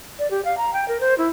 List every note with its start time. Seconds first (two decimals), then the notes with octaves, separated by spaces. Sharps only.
0.19 D5
0.31 G4
0.45 F5
0.58 A#5
0.73 G5
0.88 A#4
1.01 C5
1.18 E4